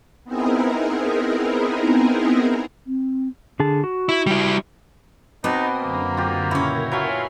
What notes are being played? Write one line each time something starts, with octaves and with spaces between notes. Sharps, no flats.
B3 C4 D#4 E4 G#4 A#4
C4
D3 G#4 A5
F#4
E4
G3 E4
B2 B3 C4 D#4 G5 D6 D#6
F#2 D3 A#3 A#5
F4 G4
A#2 C#3 C#4 E4 A#4 C#5 A#5
F#3 F4 E5 G#5 B5 F6 C7